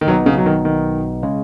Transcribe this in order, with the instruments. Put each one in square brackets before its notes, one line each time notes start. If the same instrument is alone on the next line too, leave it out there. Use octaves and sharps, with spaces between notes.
[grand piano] D#3
[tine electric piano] B1 B2 B3 D#4 [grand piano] F#3
[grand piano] C#3
F#3
D#3
D#3
[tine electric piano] C#3 G#3